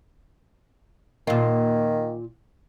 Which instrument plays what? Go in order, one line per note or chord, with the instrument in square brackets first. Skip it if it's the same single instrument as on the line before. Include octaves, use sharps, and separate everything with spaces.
[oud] A#2 F4 [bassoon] D#3